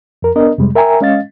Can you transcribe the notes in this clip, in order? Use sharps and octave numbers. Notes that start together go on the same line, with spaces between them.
F2 A#4
B3 D4 A#4 D#5
F2 C3 G3 G#3
A#4 E5 G5 G#5 A#5
G#3 C#4 D#5 F5 A6